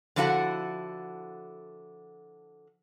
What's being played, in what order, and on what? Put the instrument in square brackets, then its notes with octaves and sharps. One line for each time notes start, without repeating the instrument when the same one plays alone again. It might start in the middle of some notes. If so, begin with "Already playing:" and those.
[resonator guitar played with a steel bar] D3 F3 E4 F#4 A4 F#5